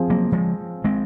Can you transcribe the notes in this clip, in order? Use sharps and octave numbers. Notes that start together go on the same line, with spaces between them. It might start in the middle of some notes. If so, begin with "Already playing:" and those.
Already playing: F3 C4 F4 G#4
F#3 A#3
F3 G#3
G#3 C4